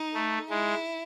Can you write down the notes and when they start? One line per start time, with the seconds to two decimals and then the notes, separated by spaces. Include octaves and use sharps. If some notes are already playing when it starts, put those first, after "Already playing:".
Already playing: D#4
0.14 A3
0.49 G#3 E4